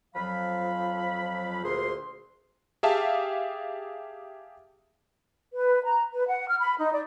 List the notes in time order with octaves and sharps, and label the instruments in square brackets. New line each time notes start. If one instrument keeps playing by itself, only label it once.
[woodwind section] F2 F3 F#3 F5 B5
D2 A#2 G#4 C5 C6
[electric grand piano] G4 G#4 E5 F5 A5
[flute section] B4
A#5
B4
F#5
F6
B5
D#4
D5